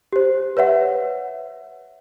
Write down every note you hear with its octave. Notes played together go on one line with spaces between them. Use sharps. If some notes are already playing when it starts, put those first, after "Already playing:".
G4 C5
B4 C#5 E5 F#5